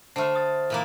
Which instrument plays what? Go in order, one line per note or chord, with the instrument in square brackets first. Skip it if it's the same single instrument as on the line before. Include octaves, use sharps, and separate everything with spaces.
[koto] D3 A3 [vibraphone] C5 [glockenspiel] A5 F6
[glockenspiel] D#6 A6
[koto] A#2 E3 A#3